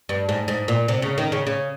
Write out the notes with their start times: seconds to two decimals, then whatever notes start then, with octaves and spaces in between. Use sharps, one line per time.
0.09 G2
0.29 G#2
0.48 G#2
0.68 A#2
0.88 C3
1.02 C#3
1.18 D#3
1.32 C#3
1.47 C#3